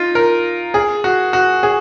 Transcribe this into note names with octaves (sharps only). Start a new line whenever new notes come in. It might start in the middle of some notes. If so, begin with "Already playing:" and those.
Already playing: D#4 F4
A#4
G#4
F#4
F#4
G#4